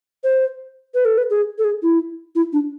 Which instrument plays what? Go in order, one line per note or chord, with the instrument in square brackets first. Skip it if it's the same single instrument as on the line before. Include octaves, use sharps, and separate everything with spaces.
[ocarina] C5
B4
A4
B4
G#4
A4
G#4
E4
E4
D4